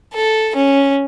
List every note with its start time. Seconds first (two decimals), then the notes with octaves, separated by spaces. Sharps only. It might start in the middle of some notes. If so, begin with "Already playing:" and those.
0.14 A4
0.56 C#4